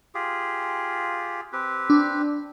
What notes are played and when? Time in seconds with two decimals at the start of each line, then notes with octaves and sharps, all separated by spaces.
0.15 F4 G4 G#4
1.53 C4 G4 B4
1.90 D4